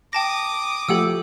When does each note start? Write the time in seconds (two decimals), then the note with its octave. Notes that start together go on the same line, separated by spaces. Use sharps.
0.13 G5 A5 D6 D#6 A#6
0.89 F3 A3 G4 A4 F#5 E6